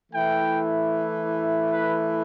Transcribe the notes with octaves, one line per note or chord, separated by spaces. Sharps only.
E3 A3 E4 G5
B4